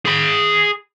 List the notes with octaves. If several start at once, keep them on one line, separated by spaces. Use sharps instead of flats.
G#4 B5